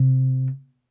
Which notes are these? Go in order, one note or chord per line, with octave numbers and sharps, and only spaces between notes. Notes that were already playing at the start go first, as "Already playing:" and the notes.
Already playing: C3